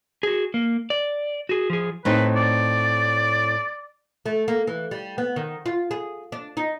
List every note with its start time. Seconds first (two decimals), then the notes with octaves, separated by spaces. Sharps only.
0.23 F#4 G#4
0.54 A#3
0.90 D5
1.49 F#4 G#4
1.70 F3 G#4
2.05 A2 C4 D#4 B4
2.35 D5
4.26 A3
4.48 A#3
4.67 E3
4.91 G3
5.18 B3
5.36 D#3
5.66 F4
5.91 G#4
6.32 D4
6.57 D#4